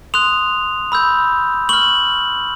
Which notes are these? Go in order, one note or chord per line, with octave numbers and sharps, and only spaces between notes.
C6 D#6 F#6 F7
B5 E6 G6
C#6 F6 F#7